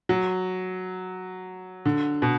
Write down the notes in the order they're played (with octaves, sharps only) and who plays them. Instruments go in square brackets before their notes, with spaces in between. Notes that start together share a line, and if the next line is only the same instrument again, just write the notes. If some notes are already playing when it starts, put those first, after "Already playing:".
[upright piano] F#3
D3
B2